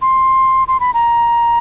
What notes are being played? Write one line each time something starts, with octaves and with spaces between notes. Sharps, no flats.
C6
C6
B5
A#5